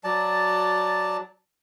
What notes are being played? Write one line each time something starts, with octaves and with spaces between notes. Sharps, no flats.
F#3 D5 A5